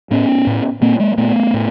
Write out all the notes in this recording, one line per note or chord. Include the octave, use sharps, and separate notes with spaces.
A2 B3 C#4
A2
A#2 A#3 C4
G#3 A#3
A#2 A3 B3
A2